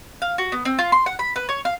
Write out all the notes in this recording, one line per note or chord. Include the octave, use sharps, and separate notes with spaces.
F5
F#4
B3
C4
F4
C6
F#5
B5
B4
C#5
F5